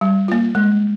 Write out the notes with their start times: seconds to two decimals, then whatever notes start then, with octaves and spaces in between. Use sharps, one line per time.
0.01 G3
0.28 A#3 F4
0.55 G#3